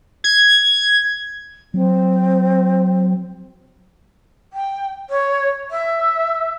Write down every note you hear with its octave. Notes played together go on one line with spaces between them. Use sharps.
G#6
F#3 C4
G5
C#5
E5